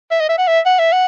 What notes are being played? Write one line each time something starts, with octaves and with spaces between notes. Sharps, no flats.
E5
D#5
E5
F#5
E5
F#5
E5
F#5